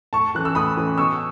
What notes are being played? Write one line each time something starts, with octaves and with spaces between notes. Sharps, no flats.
A2 A5 C#6
E3 A3 C#4 F#6
E6
A2 B5 D#6
E3 A3 C#4
B2 C#6 E6